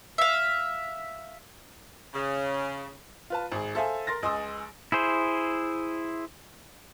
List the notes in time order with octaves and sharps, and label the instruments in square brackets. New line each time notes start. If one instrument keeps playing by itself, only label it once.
[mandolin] E5 F5
[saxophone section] C#3
[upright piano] F4 B4 A5
G#1 G#4
A4 C5 E5 F5 G#5
A#4 C6 A6 A#6
C#2 D#5 G#5 C6 D#6 E6
[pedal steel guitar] E4 G#4 C5